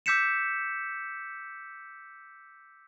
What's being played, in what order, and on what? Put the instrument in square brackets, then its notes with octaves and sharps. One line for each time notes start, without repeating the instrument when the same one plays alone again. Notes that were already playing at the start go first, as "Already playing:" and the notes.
[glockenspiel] D6 E6 G6 B6 C#7 E7